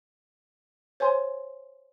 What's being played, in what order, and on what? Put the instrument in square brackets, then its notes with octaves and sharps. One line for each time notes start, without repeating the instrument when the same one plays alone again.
[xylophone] C5 C#5 G#5 C6